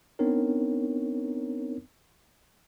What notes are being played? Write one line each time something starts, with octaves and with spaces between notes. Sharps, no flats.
B3 C4 D4 D#4 A#4 C#5